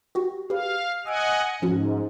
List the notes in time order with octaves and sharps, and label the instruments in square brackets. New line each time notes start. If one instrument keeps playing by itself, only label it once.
[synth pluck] F#4 G4
[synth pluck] G4 B4 [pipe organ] F5
[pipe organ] D#5 F#5 G#5 [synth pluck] D#6 E6 D7
[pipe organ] G#2 [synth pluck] F3 C#4 F#4